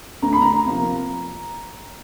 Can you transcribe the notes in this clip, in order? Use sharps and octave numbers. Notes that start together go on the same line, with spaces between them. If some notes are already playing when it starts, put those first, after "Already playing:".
D2 A#5
B5
A#5
C3 F3 A#3